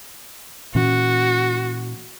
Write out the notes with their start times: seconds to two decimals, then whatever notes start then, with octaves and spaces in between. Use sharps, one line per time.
0.75 A#2 E3 C#4 F#4